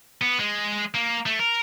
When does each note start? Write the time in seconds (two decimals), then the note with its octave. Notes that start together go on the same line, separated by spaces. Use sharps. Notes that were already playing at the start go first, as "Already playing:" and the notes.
0.22 B3
0.39 G#3
0.94 A#3
1.26 A3
1.39 A#4